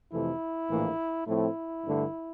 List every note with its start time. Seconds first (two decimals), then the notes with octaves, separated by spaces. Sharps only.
0.12 F2 C3 E3 A3 E4
0.69 A#1 A2 E3 A#3
1.27 A2 F3 A3 C4 E4
1.84 G2 D3 A3